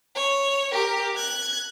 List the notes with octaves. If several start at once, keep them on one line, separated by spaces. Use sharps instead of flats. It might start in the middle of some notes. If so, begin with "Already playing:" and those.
C#5
G4 A#4
F#6 G#6